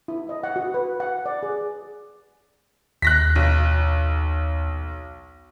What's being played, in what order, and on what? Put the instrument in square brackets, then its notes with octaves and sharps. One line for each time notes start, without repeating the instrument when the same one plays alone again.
[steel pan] E4
D#5
F#5
F#4
B4
F#5
D5
G#4
[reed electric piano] D#2 [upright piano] F#6 A#6 B6
[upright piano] B1